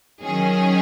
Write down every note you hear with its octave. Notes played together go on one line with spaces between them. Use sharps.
D#3 F#3 C#4 G#4